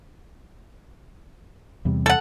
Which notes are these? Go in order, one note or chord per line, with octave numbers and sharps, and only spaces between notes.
E2 C3 G3
A4 F#5